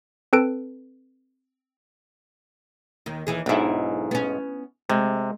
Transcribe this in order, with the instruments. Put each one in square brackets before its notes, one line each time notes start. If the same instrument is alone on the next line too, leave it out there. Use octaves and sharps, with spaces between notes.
[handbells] C4 A4 B4 A5 D7
[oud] D#2 D#3
D#2 E3 G#4
[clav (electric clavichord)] B1 G#2 [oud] D4 E4
[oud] B3 C#4
[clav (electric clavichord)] C3 [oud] G#3